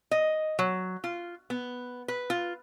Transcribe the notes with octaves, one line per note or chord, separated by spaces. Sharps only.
D#5
F#3
F4
B3
B4
F4